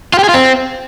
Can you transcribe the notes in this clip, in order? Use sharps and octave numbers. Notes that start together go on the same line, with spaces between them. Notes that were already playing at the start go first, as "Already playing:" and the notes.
F4
G4
G#4
F4
C4